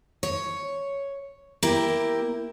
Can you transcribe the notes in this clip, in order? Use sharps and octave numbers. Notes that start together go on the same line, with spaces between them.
C#5
A#3 E4 G4 A#4